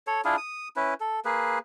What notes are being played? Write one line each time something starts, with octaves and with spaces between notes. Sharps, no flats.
A4 C#5
D4 E4 F4 G#4
D#6
C#4 E4 B4
A4
A#3 G#4 B4